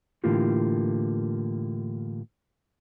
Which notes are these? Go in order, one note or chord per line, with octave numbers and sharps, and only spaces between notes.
A2 D3 E3 A#3 F4 G4